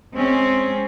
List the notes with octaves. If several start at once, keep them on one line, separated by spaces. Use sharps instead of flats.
G#3 C4 C#4